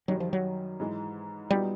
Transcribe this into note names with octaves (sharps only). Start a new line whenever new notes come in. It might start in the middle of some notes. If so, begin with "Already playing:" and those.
F#2 D#3 F#3 G3
F3
F#3
G#2 E3 G#3
A#2 F#3 G3 B3 D#4